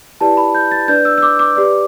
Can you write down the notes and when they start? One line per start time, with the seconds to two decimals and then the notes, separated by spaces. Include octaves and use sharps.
0.21 E4 G4 B4 D5 A5
0.37 B5
0.55 G6
0.71 A6
0.88 D4 B4 D5 G6
1.05 E6
1.18 E6
1.22 D6
1.39 D6
1.56 G4 B4 D5